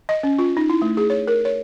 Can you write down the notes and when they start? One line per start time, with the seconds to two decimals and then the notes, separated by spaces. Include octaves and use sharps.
0.09 D#5
0.23 C#4
0.39 F4
0.57 D#4
0.70 E4
0.82 A3
0.97 G#4
1.10 C#5
1.28 A#4
1.45 C#5